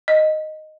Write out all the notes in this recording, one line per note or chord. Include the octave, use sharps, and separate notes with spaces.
D#5